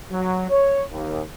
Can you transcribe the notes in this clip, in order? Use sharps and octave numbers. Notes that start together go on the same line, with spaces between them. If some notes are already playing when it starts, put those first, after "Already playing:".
F#3
C#5
D#2